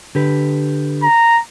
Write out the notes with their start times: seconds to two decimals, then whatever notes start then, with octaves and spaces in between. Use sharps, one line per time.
0.15 D3 G4 B4
1.03 A#5